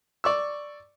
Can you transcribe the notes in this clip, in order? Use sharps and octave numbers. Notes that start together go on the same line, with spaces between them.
D5 C#6 E6